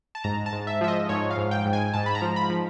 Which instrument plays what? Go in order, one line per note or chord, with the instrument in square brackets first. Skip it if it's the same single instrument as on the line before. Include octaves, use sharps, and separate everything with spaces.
[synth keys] A5
G#2 A#5
A5
G#2
E5
F3 E5
D#5
G#2 C#5
F5
G#2
G5
G#2
G#5
G#2 A5
B5
A#5
F3
B5
F3